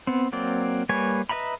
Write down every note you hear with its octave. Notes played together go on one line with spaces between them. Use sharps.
B3 C4
F#3 A#3 C4 D5
G3 A#3 B4 C#5 G#5
B4 D#5 E5 A#5 B5